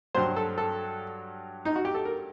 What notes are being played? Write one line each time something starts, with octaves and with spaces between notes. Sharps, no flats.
G2 F#3 C5
A4
A4
D#4
F#4
G4
A4
A#4